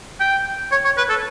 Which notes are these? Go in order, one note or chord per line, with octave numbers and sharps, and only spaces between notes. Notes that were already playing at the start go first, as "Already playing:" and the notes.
G5
C#5
C#5
B4
A4